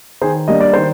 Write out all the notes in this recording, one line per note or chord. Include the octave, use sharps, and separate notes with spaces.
D#3 G#4 C5
G3 A#3 D4 D#5
D5
D#3 C5